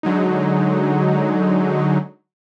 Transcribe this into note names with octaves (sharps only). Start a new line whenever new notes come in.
D3 F#3 G#3 D#4